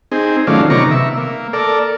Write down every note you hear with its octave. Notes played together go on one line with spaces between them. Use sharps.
C4 D#4 G#4
D#3 F#3 A3 C#4 F4 D5
C3 D#3 B3 A#5 C#6 D6
E5
A#3
A4 A#4 D5